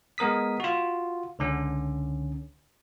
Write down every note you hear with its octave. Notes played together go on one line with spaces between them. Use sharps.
G#3 B3 A#4 D#6 B6
F4 F#4
C#2 D3 C#4